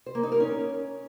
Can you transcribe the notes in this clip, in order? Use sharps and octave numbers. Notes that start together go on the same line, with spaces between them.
C5
A#3
D#4
A#4
C#4